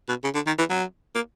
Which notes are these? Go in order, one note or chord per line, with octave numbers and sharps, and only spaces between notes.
B2
C#3
D3
D#3
E3
F#3
A#3